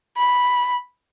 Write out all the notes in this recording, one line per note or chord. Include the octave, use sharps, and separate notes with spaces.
B5